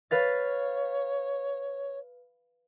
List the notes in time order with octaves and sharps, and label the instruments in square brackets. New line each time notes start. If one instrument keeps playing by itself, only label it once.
[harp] B4 F5 A6 [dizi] C#5